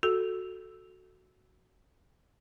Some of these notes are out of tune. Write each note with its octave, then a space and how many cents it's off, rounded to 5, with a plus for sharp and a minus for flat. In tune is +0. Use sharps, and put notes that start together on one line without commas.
F#4 +0 A4 +0